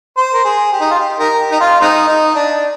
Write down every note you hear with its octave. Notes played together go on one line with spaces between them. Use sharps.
C5
A#4
G#4
G4
D#4
F4
G4
D#4 G4 A#4
G4
D#4
F4
G#3 C4 D#4
D#4
D4